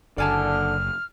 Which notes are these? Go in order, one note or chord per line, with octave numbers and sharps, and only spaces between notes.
F#1 D3 D5 G#5 A5 F6